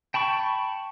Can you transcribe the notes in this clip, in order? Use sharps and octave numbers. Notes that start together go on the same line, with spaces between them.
G5 A5 B5 C#6